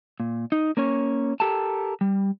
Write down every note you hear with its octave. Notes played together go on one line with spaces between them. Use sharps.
A#2
D#4
A#3 C#4 C#5
G4 A4 A#4 G5 A5
G3